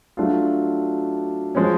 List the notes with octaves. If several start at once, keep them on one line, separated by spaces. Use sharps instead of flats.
F#3 A3 D4 F4
F3 G#3 C#4